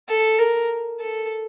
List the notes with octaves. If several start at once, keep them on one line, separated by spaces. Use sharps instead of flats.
A4
A#4
A4